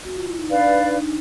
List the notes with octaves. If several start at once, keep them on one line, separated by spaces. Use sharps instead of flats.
F#4
F4
E4
D#4
D4 B4 D5 F5
D#4
D#4